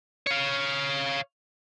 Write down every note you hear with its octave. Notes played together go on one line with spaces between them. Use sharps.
C#5 F5